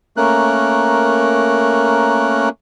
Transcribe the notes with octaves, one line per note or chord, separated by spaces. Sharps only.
A3 A#3 C#4 A#4 F#6